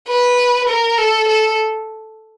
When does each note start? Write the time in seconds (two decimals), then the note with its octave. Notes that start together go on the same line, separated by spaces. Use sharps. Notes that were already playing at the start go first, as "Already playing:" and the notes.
0.09 B4
0.69 A#4
0.98 A4
1.28 A4